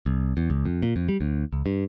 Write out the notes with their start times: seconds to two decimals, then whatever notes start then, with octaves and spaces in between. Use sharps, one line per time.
0.06 C2
0.37 E2
0.50 C#2
0.65 F2
0.82 A#2
0.96 F2
1.09 G3
1.21 D2
1.53 C#2
1.66 G2